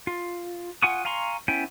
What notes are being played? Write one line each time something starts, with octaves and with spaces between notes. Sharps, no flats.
F4
F4 F#5 G#5 C#6 D#6
F5 G#5 A#5 C6 C#6
B3 C#4 E4 G5 G#5